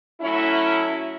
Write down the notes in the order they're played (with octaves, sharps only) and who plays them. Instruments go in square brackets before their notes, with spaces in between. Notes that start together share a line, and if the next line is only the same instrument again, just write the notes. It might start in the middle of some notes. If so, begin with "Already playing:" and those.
[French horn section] F#3 A3 C#4 E4